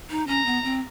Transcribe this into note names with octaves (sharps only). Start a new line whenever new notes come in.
D#4
C#4 A#5
B3
C4